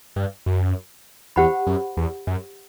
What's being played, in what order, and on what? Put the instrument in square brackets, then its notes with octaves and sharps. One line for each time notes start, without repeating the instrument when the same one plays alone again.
[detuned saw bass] G2
F#2
[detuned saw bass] E2 [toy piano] G4 C5 F#5 B5
[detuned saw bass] F#2
E2
F#2